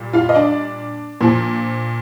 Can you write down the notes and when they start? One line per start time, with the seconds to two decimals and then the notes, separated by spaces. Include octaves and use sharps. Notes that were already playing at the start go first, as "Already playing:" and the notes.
Already playing: A#2 G3
0.13 F4 F5
0.29 D#5
0.35 D4 D5
1.21 A#2 F3